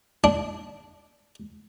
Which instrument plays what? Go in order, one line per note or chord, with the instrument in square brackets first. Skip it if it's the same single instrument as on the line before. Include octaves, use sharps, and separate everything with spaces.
[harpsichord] D4